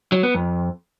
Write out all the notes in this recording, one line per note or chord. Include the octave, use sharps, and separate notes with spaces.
F#3
B3
F2